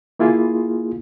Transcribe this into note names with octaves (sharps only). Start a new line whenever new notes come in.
A#3 E4 F4 G#4